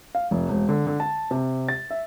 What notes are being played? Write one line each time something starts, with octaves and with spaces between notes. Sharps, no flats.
F5
F1
E1
D3
D3
A5
C3
A6
E5